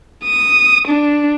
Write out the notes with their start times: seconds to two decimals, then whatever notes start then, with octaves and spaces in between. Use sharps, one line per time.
0.24 D#6
0.88 D4